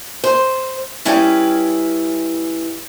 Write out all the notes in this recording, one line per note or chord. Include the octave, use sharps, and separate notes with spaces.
C5
G3 C#4 E4 G#4 B4 G5